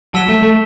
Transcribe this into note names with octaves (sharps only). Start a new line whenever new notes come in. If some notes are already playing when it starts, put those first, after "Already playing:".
F#3 A5 E6 B6 E7 G7
A3
A3